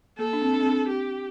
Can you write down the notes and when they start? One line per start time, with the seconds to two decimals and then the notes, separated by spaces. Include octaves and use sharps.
0.18 A#3 A4
0.33 D4
0.42 C4
0.53 D4
0.60 C4
0.68 D4
0.88 G4